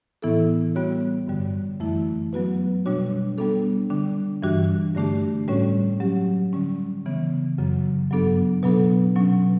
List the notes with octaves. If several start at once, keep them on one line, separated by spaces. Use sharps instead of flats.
A2 E3 B3 E4 A4
G3 B3 F#4 C#5
G2 D3 G3
F#2 E3 A3 E4
F#3 B3 F#4 B4
B2 G3 D4 F#4 C#5
G3 B3 D4 A4
D3 G3 D4
G2 E3 G3 D4 F#4
G2 D3 A3 D4 G4
A2 G3 C#4 F#4 C#5
F#3 C#4 G4
D3 G3 C#4
C#3 E3 B3
F#2 C#3 F#3
G2 F#3 B3 D4 A4
B2 F#3 B3 D4 A4
B2 F#3 C#4